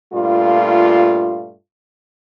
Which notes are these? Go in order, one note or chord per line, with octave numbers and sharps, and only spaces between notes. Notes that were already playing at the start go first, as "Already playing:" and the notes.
G2 A#2 A3 F4